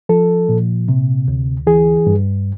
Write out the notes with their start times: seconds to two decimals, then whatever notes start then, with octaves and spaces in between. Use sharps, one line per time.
0.09 F3 A4
0.49 A#2
0.89 C3
1.28 D2
1.67 E3 G#4
2.07 G2